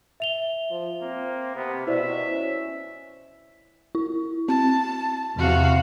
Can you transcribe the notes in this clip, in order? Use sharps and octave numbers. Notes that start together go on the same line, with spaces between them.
E5 F7 G7
F3
A#3 C4
C3 B3
B2 E4 C5 D5 E5
C#4
E4
C4 A5
E2 C3 F#4 F5